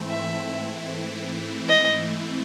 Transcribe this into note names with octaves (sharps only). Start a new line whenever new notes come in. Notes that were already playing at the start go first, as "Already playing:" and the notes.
Already playing: G#2 E3 A3 C4 E4
E5
D#5